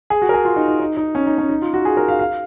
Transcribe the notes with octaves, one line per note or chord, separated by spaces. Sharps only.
G#4
F#4
A#4
G#4
F4
D#4
D#4
D#4
D#4
C#4
D#4
C#4
D#4
F4
F#4
G#4
A#4
F5
F5